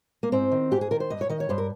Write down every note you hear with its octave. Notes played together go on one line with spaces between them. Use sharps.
A#3
G#2 C4
D#3
G#2 G4
G#4
D#3 A#4
C5
G2 D#5
C#5
D#3 D#5
C#5
G2 C5
A#4